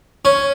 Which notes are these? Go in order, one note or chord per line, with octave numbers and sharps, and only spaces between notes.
C#4